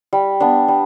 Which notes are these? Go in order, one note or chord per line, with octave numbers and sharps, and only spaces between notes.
G3
B3 D4
G3